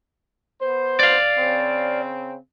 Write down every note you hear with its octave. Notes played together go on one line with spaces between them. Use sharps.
B3 C5
D5 F5
C#3 C4